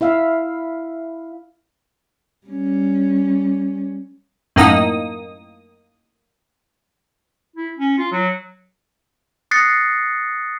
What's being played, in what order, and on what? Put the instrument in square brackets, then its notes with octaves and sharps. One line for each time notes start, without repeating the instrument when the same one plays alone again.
[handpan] E4 E5 F5
[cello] G3 C#4
[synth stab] F#2 A2 A#3 D#4 D#6
[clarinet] E4
C#4
F4
F#3
[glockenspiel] D#6 F#6 A6 A#6 C7 C#7